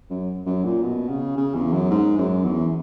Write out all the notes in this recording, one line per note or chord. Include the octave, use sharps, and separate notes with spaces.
F#2
F#2
A#2
B2
C#3
C#3
E2
F#2
G#2
F#2
E2